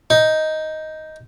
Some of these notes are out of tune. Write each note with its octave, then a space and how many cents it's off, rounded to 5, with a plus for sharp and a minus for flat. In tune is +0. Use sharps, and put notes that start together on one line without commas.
D#4 +5